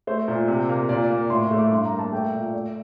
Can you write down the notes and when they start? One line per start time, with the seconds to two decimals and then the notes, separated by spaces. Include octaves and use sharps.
0.07 A3 C5
0.28 A#2
0.48 C3
0.69 A#3
0.89 A#2 D5
1.10 A#3
1.30 A2 C6
1.44 C6
1.51 A3
1.58 D6
1.71 G2 C6
1.85 A#5
1.92 A#3
1.99 A5
2.12 A3 G5
2.33 A#2
2.53 A3 D5